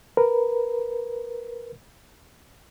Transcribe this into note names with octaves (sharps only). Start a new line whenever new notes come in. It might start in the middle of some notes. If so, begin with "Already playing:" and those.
A#4 B4